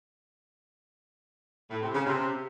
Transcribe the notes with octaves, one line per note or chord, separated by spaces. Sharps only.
A2
C3
C#3
C3